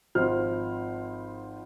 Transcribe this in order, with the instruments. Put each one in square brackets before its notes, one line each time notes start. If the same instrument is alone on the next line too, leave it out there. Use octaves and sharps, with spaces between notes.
[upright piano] G#1 F3 C5 F6